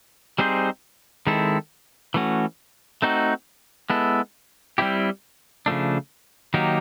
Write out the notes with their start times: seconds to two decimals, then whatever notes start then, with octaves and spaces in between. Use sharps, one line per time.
0.38 G3 C4 D#4 G#4 C5
1.27 D#3 G#3 C4 E4 A4
2.14 E3 A3 C#4 F#4
3.02 A3 C4 D#4 F#4
3.90 G#3 B3 E4 A4
4.78 G3 C4 E4 G4
5.66 C#3 F3 A3 D4
6.54 D#3 F#3 A#3 D#4 G4